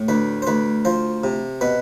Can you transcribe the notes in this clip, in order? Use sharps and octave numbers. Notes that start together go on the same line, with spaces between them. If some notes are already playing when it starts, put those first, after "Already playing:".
Already playing: A2
D2 B4
C5
D2 B4
F3 C5
C3
B2 B4